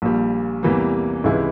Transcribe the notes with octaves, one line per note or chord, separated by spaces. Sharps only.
A#1 A#2 G3
E2 C3 E3 G3 A#3
C#2 C3 E3 G#3 E4